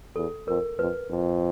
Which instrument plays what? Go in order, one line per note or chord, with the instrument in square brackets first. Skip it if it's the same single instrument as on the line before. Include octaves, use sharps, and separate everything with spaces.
[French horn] E2 [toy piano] A4
[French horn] F2 [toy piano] A#4
[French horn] F2 [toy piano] B4
[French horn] F2